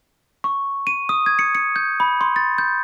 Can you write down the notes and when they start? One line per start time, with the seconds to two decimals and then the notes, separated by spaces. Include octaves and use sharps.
0.44 C#6
0.87 D#7
1.09 D#6
1.26 G#6
1.39 C#7
1.55 C#7
1.76 G6
2.00 B5
2.21 C6
2.36 A6
2.58 G6